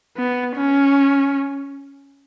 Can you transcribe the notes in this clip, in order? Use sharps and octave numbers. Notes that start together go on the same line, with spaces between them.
B3
C#4